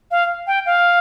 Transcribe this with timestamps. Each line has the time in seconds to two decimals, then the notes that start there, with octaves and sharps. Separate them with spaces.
0.11 F5
0.47 G5
0.66 F5